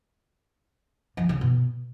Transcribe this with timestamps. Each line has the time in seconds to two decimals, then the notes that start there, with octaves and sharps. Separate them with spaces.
1.17 F3
1.29 C#3
1.41 B2